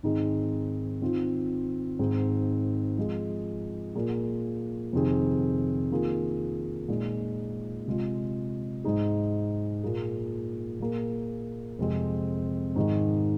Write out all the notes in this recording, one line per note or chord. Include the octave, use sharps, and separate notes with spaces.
G#2 D#3 C4 D#4 G#4
D#3 C4 F4
G#2 D#3 C4 G#4
F3 G#3 F4 G#4
A#2 A#3 F4 G#4
F2 C3 D#3 C4 G#4
D#3 A#3 F4 G#4
A#2 G#3 D#4 G#4
C3 G#3 F4
G#2 G#3 D#4 G#4
A#2 A#3 F4 G#4
A#2 A#3 G#4
F2 C3 G#3 C4 G#4
G#2 D#3 G#3 D#4 G#4